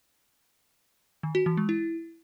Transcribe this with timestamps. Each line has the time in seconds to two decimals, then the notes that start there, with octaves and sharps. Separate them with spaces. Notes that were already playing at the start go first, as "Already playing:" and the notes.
1.23 D#3
1.35 F#4
1.46 E3
1.57 G#3
1.69 E4